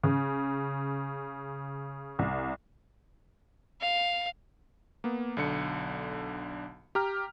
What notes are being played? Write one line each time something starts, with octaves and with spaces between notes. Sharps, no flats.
C#3
C2
F5
A#3 B3
B1 D3 C#7
G4 A#5 F6